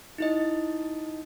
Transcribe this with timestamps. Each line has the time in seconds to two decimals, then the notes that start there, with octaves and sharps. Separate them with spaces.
0.18 D#4 E4 D#5